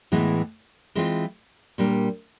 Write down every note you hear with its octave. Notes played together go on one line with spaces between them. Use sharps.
A2 E3 G#3 B3
E3 G#3 C4 F4
A#2 G3 A#3 D4